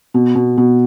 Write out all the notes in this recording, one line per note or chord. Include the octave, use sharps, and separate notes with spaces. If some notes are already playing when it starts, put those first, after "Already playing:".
B2
B2
B2